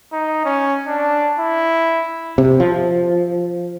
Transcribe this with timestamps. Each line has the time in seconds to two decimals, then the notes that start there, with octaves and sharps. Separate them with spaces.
0.13 D#4
0.45 C#4
0.87 D4
1.39 E4
2.38 C3
2.60 F3